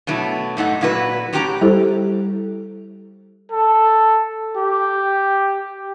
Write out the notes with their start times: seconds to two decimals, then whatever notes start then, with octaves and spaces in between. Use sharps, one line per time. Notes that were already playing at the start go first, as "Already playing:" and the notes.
0.07 B2 F#3 A3 E4
0.57 G#2 A3 D#4 F#5
0.81 A#2 F#3 E4 F#4 B4
1.33 A2 C#4 F#4 G4 G5 A#5
1.61 G3 E4 G4 A4 C5
3.51 A4
4.56 G4